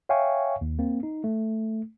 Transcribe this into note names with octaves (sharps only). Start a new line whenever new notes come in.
C#5 E5 F5 G5 G#5 C#6
D#2
A#3 C4
D#4
A3